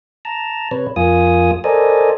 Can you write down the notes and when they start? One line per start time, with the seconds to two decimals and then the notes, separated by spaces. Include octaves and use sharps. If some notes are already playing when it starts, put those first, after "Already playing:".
0.25 A5 A#5
0.71 C3 B4 C#5
0.96 F2 A#3 F4 G#5 D#6
1.64 A4 A#4 C5 D5 D#5 G#5